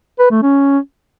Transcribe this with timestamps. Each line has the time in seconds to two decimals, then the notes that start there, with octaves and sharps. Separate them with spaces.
0.19 B4
0.31 A3
0.42 C#4